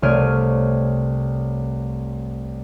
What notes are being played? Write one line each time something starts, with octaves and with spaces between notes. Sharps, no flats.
C2 A3 C#5 F6 D7 D#7